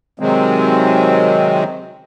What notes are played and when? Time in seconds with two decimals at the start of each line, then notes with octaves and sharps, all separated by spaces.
0.20 C3 D#3 F#3 G#3 C4